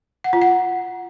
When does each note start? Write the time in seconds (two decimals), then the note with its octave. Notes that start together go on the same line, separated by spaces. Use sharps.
0.24 F#5
0.33 F4
0.42 F#5